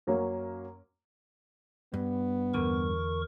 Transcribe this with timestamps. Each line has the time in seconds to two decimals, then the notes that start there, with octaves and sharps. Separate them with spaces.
0.07 F#2 F#3 A#3 C#4
1.94 G2 B3
2.54 E2 D3 A#4 C#6